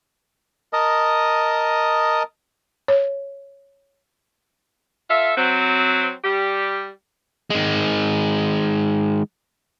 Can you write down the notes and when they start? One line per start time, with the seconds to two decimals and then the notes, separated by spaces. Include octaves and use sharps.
0.73 A#4 D#5 A5 D#6
2.88 C#5
5.10 F4 A4 E5
5.37 F#3 C4
6.24 G3 G4
7.50 D#3 G#3